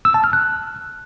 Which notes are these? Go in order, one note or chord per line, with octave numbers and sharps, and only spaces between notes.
E6
A5
F6
F#6